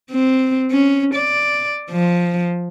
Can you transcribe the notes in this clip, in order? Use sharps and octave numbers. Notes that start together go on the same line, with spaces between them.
C4
C#4
D5
F3